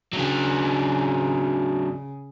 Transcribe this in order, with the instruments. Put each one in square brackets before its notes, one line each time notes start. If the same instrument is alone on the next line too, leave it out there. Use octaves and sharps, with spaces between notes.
[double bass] C#3 [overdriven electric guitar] F#3 D4